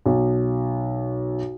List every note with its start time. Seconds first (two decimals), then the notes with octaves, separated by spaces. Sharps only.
0.06 B1